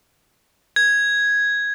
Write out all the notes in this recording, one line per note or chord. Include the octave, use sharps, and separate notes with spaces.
G#6